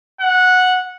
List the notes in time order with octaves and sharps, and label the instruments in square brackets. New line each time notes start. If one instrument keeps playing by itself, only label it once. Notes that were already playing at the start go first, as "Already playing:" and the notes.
[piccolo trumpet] F#5